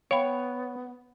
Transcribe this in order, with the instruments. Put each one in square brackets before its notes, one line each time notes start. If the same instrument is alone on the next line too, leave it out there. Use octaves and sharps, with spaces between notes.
[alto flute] B3 [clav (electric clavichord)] C#5 [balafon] F5 G5 B5